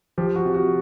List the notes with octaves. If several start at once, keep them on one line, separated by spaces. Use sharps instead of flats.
F3 G4
F#4
C3
F#4